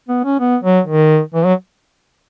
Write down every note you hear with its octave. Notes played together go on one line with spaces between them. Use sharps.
B3
C#4
B3
F#3
D#3
E3
F#3